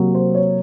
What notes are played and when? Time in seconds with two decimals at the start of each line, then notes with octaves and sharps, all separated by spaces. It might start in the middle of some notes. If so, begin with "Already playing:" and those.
Already playing: C3 F#3 A#3
0.15 C5
0.35 C#5